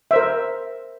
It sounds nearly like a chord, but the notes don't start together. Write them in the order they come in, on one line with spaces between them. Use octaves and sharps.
E5 C5 A#4